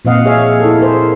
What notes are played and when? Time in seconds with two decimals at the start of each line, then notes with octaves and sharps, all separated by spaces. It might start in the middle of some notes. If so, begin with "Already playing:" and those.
0.05 A#2 F3 C4 D#5 F5 F#5
0.26 G#4 C#5 E5 F5
0.60 E4 A4
0.80 G#4 A#4 C5